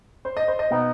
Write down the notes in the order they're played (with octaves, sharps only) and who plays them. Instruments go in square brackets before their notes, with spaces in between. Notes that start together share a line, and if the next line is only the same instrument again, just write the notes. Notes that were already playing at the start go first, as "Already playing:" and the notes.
[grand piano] C5
D#5
C5
D#5
[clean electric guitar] B2 B3 D#4